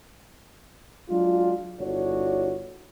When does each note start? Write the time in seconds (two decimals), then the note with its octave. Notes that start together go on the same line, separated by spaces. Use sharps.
1.10 F#3 G#3 D4 F4
1.80 G1 D4 E4 F#4 C#5